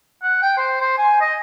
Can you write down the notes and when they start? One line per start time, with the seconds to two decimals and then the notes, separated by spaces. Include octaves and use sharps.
0.22 F#5
0.42 G5
0.58 C5
0.81 C5
0.98 G#5
1.21 D#5